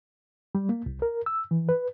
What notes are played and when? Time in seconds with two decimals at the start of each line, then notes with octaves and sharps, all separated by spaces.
0.55 G3
0.69 A#3
0.86 C2
1.02 A#4
1.26 E6
1.51 E3
1.69 B4